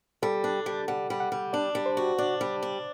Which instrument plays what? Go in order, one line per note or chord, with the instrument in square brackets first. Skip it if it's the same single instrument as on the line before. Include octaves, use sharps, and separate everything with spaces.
[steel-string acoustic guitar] G3 [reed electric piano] A4
[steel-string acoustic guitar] D4
G3
[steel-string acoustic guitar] G3 [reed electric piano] F#5
[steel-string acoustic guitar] G3
[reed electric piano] F#5
[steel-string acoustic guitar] G3
[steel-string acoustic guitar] D4 [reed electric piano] D5
[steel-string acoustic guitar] G3
[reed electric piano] C5
[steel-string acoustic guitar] F#4
[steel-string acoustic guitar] D4 [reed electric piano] D5
[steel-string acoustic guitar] G3
D4